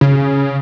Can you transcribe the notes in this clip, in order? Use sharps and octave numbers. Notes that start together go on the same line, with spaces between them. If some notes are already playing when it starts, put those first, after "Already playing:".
C#3